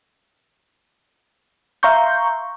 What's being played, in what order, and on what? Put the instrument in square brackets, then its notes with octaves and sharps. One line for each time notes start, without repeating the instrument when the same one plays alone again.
[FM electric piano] E5 F5 A#5 C6 C#6 G6